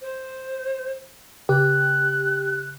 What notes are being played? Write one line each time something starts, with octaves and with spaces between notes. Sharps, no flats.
C5
C#3 G4 F#6